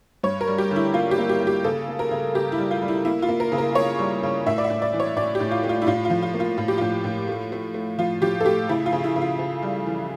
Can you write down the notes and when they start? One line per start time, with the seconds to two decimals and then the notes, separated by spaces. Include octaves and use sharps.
0.23 G2 C#5
0.41 A#4
0.47 G3
0.58 G4
0.71 D3
0.76 E4
0.94 A#3 F4
1.11 G4
1.18 A#3
1.29 G4
1.41 A#3
1.47 G4
1.64 C#3 A4
1.88 A#3
1.99 A#4
2.11 C#3
2.35 C#3 G4
2.52 E4
2.58 G3
2.71 F4
2.82 G3
2.88 E4
3.05 A#3 E4
3.22 F4
3.29 A#3
3.40 A#4
3.52 C#3
3.58 A#4
3.75 A#3 C#5
3.99 G3
4.23 C#3
4.46 A2 E5
4.58 D5
4.64 E5
4.70 A2
4.82 D5
4.93 E3
5.00 C#5
5.16 A2 D5
5.35 G4
5.40 A2
5.51 F4
5.63 A3
5.69 F4
5.82 E4
5.87 A2 F4
6.05 F4
6.10 F3
6.22 F4
6.34 A#3
6.40 F4
6.58 A2 F4
6.68 G4
6.78 A2 F4
7.04 A2
7.27 A3
7.52 A3
7.74 A3
7.98 F3 F4
8.22 F3 G4
8.40 A4
8.45 A3 G4
8.69 C#3 E4
8.86 F4
8.93 C#3
9.04 E4
9.16 C#3
9.22 F4
9.39 C#3
9.63 G3
9.86 E3